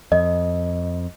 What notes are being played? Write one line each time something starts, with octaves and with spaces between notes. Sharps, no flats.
F2 D#5